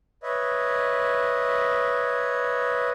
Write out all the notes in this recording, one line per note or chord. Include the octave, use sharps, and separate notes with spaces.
B4 C#5 D#5 E5